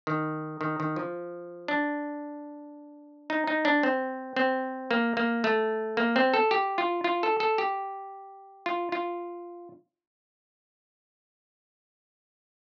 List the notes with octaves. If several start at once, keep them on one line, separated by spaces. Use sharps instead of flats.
D#3
D#3
D#3
F3
D4
D#4
D#4
D4
C4
C4
A#3
A#3
A3
A#3
C4
A4
G4
F4
F4
A4
A4
G4
F4
F4